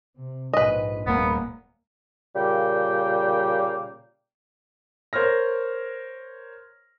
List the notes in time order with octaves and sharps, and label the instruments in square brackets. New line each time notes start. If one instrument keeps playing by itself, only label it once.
[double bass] C3
[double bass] A#1 G#2 [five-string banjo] B4 D#5
[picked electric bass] D#1 A#3 [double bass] G#3 [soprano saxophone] B3
[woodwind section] A#2 C#3 G3 A#3 G5
[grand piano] A#4 C5 C#5 F6 A#6